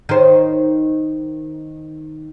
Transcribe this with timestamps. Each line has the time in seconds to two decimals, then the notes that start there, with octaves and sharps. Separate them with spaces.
0.09 D#3 C5